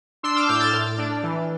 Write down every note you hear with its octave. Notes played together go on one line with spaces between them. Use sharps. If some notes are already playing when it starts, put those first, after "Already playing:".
D4 C6 E6
D6 F6
A2 E6 G6
F6 A6
A2
D4
E3